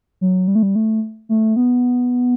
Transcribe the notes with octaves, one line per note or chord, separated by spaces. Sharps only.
F#3
G3
A3
G3
A3
A3
B3